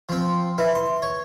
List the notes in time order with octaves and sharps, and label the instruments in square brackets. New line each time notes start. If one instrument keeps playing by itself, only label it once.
[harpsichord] F3 C4
[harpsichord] E4 [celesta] B4 E5
[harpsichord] C6
C#5